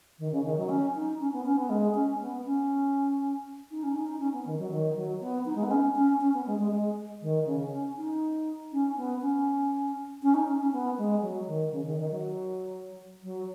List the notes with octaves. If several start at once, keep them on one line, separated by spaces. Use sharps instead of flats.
D#3
C#3
D#3
F#3
C#4
D#4
C#4
B3
C#4
B3
G#3
C#4
B3
C#4
D#4
C#4
D#4
D#4
C#4
B3
D#3
F#3
D#3
F#3
B3
D#4
G#3
B3
C#4
C#4
C#4
B3
G#3
G#3
G#3
D#3
C#3
C#4
D#4
C#4
B3
C#4
C#4
D#4
C#4
C#4
B3
G#3
F#3
D#3
C#3
D#3
D#3
F#3
F#3